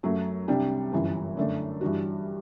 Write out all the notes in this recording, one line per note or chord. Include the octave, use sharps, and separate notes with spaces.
F#2 F#3 A3
C2 C3 G3 D4 G4
G1 F#2 E3
F#2 D3 A3 D4
G2 E3 G3 D4 F#4